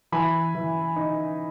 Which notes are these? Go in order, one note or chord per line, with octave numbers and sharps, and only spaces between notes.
E3 G#5 B5
E3
D#4